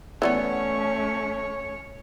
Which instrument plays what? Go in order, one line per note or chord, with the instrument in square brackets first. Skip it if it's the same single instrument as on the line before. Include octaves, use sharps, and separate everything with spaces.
[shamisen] E3 G3 B3 [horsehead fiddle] A3 C#4 [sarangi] C#5 [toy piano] D5